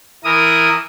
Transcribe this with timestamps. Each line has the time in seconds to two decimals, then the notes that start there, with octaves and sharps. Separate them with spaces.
0.24 E3 E4 A#4 D#6